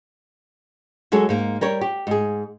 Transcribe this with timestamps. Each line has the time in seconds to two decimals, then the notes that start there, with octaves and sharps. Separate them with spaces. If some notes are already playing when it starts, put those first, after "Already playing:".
1.12 F#3 G#3 G#4 A4 C#5
1.29 G#2 A#3
1.61 G3 A#4 C#5
1.81 G4
2.07 G#2 G#4